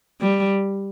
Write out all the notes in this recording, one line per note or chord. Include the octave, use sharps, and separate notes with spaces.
G3